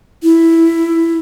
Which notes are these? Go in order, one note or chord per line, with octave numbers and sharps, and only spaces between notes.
E4